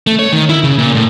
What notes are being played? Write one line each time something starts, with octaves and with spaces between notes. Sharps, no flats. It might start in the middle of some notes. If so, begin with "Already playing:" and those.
A3
C#5
D#3
E4
C#3
A#2
A2